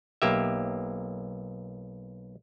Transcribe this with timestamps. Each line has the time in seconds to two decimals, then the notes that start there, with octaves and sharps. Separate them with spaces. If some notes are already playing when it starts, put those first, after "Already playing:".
0.22 B1 A#3 G4 E5